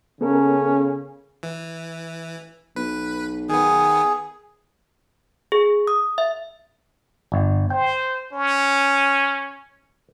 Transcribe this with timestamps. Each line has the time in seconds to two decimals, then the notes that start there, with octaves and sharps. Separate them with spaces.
0.21 C#3 B3 C#4 A4 A#4
1.43 E3
2.76 B1 B4
3.49 D#3 B3 G#4
5.52 G#4
5.87 D#6
6.18 E5
7.32 G1
7.70 C5 G5
8.33 C#4